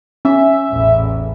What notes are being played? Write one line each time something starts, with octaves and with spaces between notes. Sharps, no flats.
C#4 E5
A1 E2